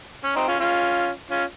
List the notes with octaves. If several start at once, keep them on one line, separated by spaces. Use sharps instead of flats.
C#4
C4 D#4
C#4 F4
C#4 F4
C#4 F4